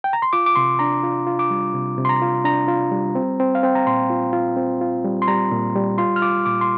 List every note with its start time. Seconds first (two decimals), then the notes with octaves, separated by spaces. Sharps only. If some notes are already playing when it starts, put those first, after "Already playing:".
0.04 G5
0.13 A#5
0.22 C6
0.33 F4 D6
0.46 D6
0.55 C3 C6
0.79 D4 A#5
1.03 F4
1.27 F4
1.39 D6
1.50 G3
1.74 C3
1.98 C3
2.05 C6
2.09 A#5
2.22 F4
2.44 D4 A#5
2.68 F4
2.91 G3
3.15 C4
3.40 C4
3.55 F5
3.63 C4 G5
3.75 A#5
3.87 A#2 C6
4.10 F4
4.33 F4
4.57 C4
4.81 F4
5.04 G3
5.22 C6
5.28 G3 A#5
5.52 A#2
5.76 G3
5.98 F4 C6
6.16 F6
6.22 F4 D6
6.46 A#2 D6
6.61 C6